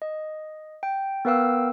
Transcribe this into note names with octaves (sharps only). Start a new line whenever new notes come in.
D#5
G5
B3 A#4 B4 F5 G5 E6